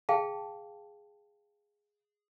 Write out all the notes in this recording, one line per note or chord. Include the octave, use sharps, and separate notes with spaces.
G#4 F5 G5 A5